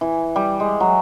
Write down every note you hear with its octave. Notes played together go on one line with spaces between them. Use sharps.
E3
G3
G#3
F#3